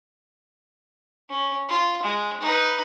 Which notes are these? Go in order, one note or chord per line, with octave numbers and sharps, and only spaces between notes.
C#4
F4
G#3
D#4 B4